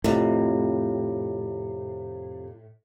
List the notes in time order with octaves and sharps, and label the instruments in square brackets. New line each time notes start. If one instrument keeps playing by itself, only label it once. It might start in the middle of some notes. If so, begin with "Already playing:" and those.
[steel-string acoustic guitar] F2 C3 [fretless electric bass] A2